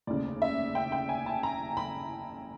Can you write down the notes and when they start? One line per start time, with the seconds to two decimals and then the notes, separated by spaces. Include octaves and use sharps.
0.07 F1 D#2 C#3 D5
0.42 E5
0.75 G5
0.92 G5
1.09 G#5
1.26 A5
1.43 A#5
1.77 B5